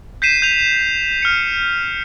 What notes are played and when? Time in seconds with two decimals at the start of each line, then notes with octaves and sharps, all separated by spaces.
0.22 G6 B6 C7 D#7 E7
0.42 G6 F7
1.22 F6 C#7